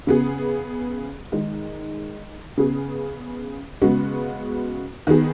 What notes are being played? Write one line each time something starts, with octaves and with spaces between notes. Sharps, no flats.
C#3 B3 G#4
D#3 G#3 D#4
C#3 B3 G#4
C#3 G#3 B3 F#4
D#3 B3 G#4